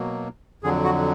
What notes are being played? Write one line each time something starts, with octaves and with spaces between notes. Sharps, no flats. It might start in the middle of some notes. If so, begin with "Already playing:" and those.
Already playing: B2 F#3 A#3
F2 D3 F#3 G#4
F#4